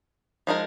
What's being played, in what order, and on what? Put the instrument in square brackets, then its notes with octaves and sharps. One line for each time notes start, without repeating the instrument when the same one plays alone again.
[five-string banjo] F3 G#3 D#4 A#4